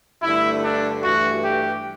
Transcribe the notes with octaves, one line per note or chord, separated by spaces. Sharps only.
G2 D3 A3 E4
D4
G2 E3 A3 F#4
G4